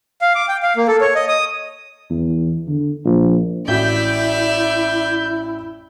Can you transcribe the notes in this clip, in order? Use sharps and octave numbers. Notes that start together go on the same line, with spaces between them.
F5
D6
G5
F5
A#3
A4
C#5
D#5
D#6
E2
D3
A#1
A1 E4 F#4 D5 E5 G6